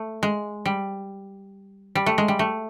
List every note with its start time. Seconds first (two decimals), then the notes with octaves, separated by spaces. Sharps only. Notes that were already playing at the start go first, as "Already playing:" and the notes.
Already playing: A3
0.23 G#3
0.66 G3
1.95 G3
2.06 A3
2.18 G#3
2.28 G3
2.39 A3